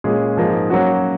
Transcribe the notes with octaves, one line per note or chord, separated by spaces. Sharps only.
A#2 G#3 C#4 G#4
G#2 F3 A#3 D#4 G#4
F#3 A#3 C#4 F#4